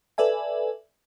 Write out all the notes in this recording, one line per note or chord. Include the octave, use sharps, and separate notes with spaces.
A4 B4 D5 E5 G#5